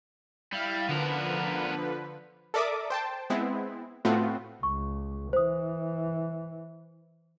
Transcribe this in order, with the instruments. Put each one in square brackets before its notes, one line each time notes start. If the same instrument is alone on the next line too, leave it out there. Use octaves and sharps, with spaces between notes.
[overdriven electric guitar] G3 [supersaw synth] E4 F5
[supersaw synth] D3 F3 B4 [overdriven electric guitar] B3 A#4
[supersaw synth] A4 A#4 D5 E5 D6 D#6
C5 G5 A5
G#3 B3 C4 E4
A2 A3 B3 C4 F4 F#4
[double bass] C#2 [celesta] C#6
[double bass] E3 [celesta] C5 D#6